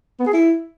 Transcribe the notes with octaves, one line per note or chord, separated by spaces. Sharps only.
B3
G#4
E4